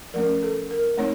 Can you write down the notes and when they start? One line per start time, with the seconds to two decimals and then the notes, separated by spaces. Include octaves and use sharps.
0.14 F3 A3 C#4 A#4
0.43 A4
0.71 A#4
0.98 A3 C4 D#4 C#5